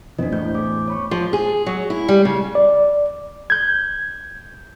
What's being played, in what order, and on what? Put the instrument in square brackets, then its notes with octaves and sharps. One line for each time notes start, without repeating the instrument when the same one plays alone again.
[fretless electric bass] F2 B2 E3 [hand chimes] D4 C5 D#5
[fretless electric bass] E2 A2 [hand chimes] A3 C5 G6
[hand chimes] A3 G#4 D6
C#5 B5 C#6
[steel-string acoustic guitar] F3
G#4
F#3
E4
G3
C#3
[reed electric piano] D5
G6 G#6